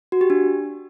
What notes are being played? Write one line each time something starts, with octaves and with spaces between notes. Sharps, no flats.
F#4
G4
D4